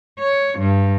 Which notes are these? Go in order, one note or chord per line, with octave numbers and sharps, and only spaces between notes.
C#5
G2